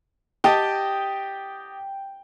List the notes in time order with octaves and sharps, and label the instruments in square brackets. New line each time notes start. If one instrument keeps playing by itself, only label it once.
[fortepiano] G4 D#5 A5 [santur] G5